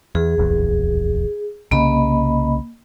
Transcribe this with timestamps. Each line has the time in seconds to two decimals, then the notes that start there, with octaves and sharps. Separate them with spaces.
0.15 E2 G#4
0.38 D1 A#1 E2
1.71 C2 C#3 A#3 D#5 B5